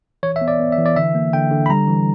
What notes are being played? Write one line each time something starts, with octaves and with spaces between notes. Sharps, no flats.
E3 C#5
E5
B3
D5
B3
E5
E3
D5
D3 E5
A#3
D3 G5
D3
B5
G3 A#5
E3